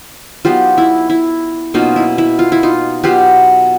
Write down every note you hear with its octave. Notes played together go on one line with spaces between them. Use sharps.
F#3 B3 D#4 F4 G4
E4
E4
B2 F#3 A#3 C#4 D#4 F4
E4
E4
F4
E4
D#4 F4
B2 F#3 B3 D#4 F4 G4